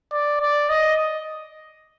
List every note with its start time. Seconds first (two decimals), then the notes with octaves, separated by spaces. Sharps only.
0.12 D5
0.41 D5
0.69 D#5